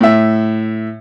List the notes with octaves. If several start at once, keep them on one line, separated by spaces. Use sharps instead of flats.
A2 E5